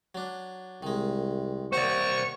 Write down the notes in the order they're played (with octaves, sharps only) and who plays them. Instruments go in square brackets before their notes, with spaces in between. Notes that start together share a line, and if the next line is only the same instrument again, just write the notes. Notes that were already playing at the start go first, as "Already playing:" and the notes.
[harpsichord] F#3 D4
[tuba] C2 [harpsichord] D#3 G#3
[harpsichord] D#2 F#5 A#5 [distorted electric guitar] C5 D5 [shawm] C#6